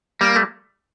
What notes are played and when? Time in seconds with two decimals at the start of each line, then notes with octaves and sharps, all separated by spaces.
0.21 G3 A#3
0.36 A3